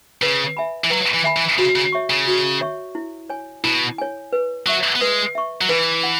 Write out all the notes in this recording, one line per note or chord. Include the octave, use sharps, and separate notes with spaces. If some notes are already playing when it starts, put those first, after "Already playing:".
C#3 B4
E5 G#5 B5
E3
F#3 B4
E3
E5 G#5 B5
E3
C#3 F#4
C#3
C#5 E5 C#6
C#3
F#4
C#5 E5 C#6
E4
C#5 G#5
B2 E4
C#5 G#5
B4
F#3 E5 C#6
B3
G#3 B4
E5 C#6
F#3
E3 B4
F#5